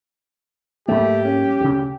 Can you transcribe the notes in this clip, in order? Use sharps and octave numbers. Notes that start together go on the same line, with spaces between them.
G#2 F#3 A3 A#3 G4
C#4
D2 C#3